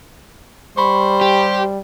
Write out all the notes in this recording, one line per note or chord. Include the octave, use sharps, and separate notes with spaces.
G3 C5 B5 C#6
G4